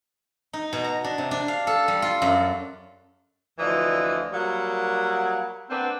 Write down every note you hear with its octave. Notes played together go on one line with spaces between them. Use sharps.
D#4
B2
A#5
D4
C3
D4
F5
A4
G3
F4
F#2
D2 E3 F3 D5 D#5
F#3 G3 A#3 F#5
A#3 C4 D4 B4 F#5